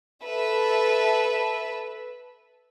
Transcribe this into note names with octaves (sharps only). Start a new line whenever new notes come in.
A4 B4 E5